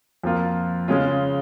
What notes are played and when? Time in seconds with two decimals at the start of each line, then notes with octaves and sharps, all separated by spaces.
0.24 F2 F3 A#3 F4
0.88 C#3 G#3 C#4 F4